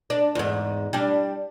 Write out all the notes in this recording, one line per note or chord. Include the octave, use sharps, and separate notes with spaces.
D4
E2 G#2
G3 D4